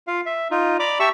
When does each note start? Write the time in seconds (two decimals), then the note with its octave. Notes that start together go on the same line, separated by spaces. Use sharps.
0.07 F4 F5
0.26 E5
0.51 D#4 F4
0.79 D5 A#5 B5 D6
1.00 G4 E5 A5 C#6 E6